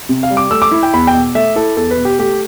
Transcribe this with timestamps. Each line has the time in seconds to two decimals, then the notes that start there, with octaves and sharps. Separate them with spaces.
0.09 C3
0.23 F5
0.30 G3
0.37 D6
0.51 A3 E6
0.62 D6
0.72 E4
0.83 G5
0.93 E2 B5
1.07 G5
1.14 B2
1.35 A3 E5
1.55 E4 A4
1.76 E2 A4
1.91 B4
1.97 B2
2.05 G4
2.18 A3 G4